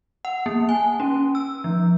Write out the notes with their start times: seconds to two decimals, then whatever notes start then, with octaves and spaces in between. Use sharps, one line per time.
0.25 F#5
0.46 A#3
0.69 G#5
1.00 C#4
1.35 E6
1.64 F3